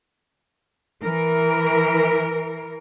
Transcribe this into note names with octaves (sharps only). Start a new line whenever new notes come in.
E3 A#4